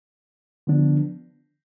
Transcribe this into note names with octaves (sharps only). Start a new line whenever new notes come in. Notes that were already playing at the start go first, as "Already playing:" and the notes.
D3 F3 B3 D4